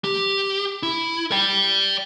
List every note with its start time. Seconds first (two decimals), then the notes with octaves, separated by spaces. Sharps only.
0.04 G4
0.83 E4
1.32 D5 G5